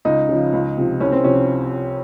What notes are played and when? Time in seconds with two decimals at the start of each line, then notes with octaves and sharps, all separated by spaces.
0.05 C#2 D#4
0.29 C#3 F3
0.53 C#2
0.77 C3 F3
1.00 C2 C#4
1.12 C4
1.24 C3 F3 C#4